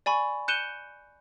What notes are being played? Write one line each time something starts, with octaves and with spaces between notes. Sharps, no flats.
D5 G#5 B5 C#6
F#6 G6 C#7 D#7 E7 G7